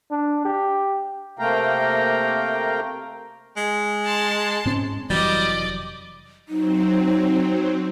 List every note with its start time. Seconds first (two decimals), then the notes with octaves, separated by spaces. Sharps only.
0.11 D4
0.45 G4
1.39 C3 A3 A#3 F5 G5 A#5
3.57 G#3
4.05 A5 C6
4.65 G#2 C4 C#4
5.10 F1 E3 F#3 G3 D5 D#5
6.49 F#3 C4 D#4